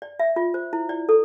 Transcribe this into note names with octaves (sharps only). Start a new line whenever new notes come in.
D5
E5
F4
C5
E4
D5
A4